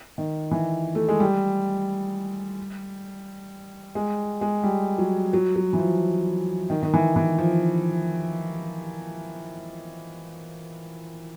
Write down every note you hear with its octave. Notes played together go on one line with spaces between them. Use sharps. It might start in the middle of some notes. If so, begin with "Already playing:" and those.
D#3
E3
A3
G#3
G3
G#3
G#3
G3
F#3
F#3
F#3
E3
F3
D#3
D#3
E3
E3
F3